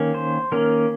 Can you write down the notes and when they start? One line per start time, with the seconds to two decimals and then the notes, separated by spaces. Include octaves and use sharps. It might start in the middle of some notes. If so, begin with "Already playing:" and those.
Already playing: D#3 A#3 C#4
0.14 C5
0.52 D#3 A#3 C#4 A#4